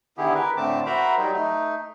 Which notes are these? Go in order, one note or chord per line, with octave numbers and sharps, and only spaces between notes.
D3 D#3 B3 E4 G4 G#4
A#4 B4
A2 D3 A3 C4 A5 D6
F#4 A#4 C5 E5 A#5 B5
F#3 G3 D#4
A3 D#4